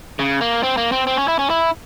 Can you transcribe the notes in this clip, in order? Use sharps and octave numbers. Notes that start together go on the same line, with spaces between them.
C#3
A#3
C4
A#3
C4
C4
C#4
E4
C#4
E4